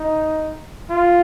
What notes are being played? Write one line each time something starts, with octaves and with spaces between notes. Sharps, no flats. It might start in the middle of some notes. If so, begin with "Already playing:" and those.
Already playing: D#4
F4